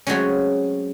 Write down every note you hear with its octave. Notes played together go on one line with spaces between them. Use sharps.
F#3 G#3 A3 C4 C#4